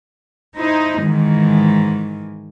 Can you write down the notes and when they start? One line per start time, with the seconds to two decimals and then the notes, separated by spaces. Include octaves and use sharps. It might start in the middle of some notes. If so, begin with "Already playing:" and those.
0.57 D#4 E4 C5 D#5
1.01 G#2 D#3 E3